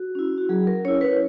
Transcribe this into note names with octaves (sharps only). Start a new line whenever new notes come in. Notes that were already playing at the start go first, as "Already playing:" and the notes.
Already playing: F#4
C#4 E4
F#4
F#3 G#4
A#4
C#4 E4 C#5
B4